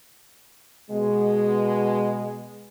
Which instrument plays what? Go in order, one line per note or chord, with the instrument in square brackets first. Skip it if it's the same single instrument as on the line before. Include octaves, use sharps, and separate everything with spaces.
[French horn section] B2 G#3